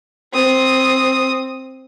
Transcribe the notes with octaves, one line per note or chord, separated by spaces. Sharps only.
C4 D#6